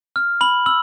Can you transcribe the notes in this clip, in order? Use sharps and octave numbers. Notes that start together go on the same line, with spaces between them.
F6
B5 F#7
E6 F#7